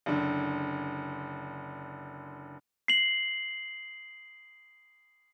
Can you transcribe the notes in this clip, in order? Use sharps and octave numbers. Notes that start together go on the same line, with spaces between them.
F#1 D3
C7 F#7